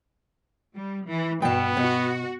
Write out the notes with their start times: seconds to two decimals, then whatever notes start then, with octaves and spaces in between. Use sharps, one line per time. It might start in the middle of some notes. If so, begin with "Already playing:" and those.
0.73 G3
1.08 E3
1.42 G2 B2 B3 G5 A5
1.77 B2 F#4